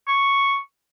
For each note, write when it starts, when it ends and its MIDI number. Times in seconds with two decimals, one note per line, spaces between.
0.07 0.58 85